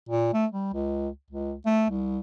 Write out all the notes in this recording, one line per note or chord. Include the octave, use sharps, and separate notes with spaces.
A#2
A3
G3
C#2
C#2
A3
C2